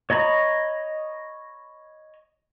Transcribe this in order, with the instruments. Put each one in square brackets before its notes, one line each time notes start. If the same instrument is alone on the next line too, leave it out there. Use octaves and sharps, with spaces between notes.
[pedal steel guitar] C#5 D#5 A#5 B5